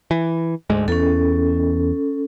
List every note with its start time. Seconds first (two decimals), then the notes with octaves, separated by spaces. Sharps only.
0.11 E3
0.70 D2 G#2 G#3
0.88 E2 C#4 A4